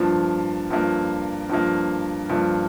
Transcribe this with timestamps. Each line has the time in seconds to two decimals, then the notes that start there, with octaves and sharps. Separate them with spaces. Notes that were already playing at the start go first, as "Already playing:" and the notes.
Already playing: G2 F3 A#3
0.70 G2 F3 A#3
1.49 G2 F3 A#3
2.29 G2 F3 A#3